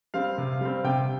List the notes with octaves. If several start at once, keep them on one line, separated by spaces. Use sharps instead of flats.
G3 C4 F5
C3
G3 C4
C3 G5